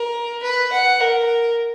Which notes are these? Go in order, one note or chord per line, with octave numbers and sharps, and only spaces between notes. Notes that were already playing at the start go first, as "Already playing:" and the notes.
Already playing: A#4
B4
F#5
A#4